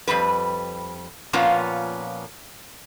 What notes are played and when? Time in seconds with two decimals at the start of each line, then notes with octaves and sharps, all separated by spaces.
0.08 F2 C3 G3 B4
1.33 A#2 F3 A#3 B3 C#4 F4